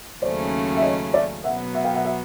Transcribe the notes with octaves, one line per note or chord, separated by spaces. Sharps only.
D#2 C#3 F#3 A3 C#4 C5 D5
E5
C#5 D#5
D5 E5
B2 F#3 B3 E5 F#5
E5 F#5
F5 G5
E5 F#5
E5 F#5